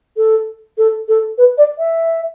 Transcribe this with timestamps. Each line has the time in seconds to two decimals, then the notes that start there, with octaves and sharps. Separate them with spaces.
0.17 A4
0.78 A4
1.08 A4
1.38 B4
1.58 D5
1.78 E5